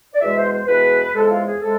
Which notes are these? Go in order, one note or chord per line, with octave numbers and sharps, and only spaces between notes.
D5
E2 B2 G#3 E5
C5
C5
E2 B2 G#3 B4
E2 C3 G#3 A4
F4
G#4
C3 G#3 A4